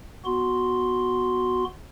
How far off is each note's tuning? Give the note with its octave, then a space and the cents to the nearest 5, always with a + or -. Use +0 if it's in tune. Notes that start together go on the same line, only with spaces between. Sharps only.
B3 +0 F#4 -5 C6 +0